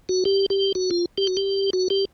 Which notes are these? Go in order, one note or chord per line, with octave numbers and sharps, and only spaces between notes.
F#4
G4
G4
F#4
F4
G4
F#4
G4
F#4
G4